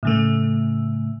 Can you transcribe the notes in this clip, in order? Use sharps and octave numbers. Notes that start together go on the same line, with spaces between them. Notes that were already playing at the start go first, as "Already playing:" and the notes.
A2 C#3 A3